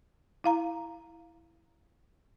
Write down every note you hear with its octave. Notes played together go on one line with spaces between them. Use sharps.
E4 F5 A#5